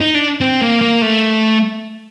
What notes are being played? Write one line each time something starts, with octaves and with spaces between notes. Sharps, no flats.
D#4
D4
C4
A#3
A#3
A3